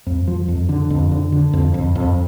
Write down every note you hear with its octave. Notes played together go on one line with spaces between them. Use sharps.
F2
F3
F2
D3
F2
D3
D3
F2
F2
F2